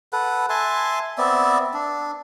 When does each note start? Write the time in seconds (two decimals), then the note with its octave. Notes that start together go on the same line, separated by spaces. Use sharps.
0.13 A4 B4 F#5
0.50 E5 G#5 A5 C6
1.18 B3 C4 D5 E5
1.74 D4